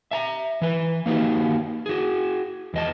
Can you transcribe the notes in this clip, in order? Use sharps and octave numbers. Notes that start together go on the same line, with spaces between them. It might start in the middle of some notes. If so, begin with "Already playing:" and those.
E5 A5 A#5
E3 B4
A#3 D#4 F#4 G4
F#4 G#4
E2 D#5 A5